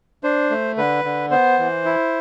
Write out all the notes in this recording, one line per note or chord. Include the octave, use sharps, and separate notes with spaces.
D4 C5
A3
D3 B4
D3
B3 C5
E3
E4